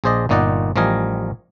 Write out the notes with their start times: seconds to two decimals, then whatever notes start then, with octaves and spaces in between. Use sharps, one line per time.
0.04 A#1 G#4 C5 D5 D#5
0.29 G1 A#2 D#4 D5 D#5 F#5
0.76 A1 F3 G3 A#4 D#5 G#5